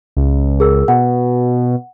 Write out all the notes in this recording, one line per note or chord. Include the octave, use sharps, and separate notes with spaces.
C#2
G#4 A#4 E6
B2 F#5